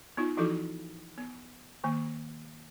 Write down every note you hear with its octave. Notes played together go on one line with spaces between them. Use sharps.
B3 D#4 F4
E3 F3 D#4 E4 F#4 A4
B3
D#3 A#3